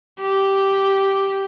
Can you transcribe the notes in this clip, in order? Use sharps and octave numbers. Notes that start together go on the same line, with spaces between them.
G4